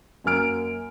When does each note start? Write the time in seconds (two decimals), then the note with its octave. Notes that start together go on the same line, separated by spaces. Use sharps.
0.24 F#2 F#3 A#3 G#5 F6 D7